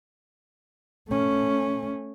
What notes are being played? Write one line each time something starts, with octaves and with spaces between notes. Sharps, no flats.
A3 C#4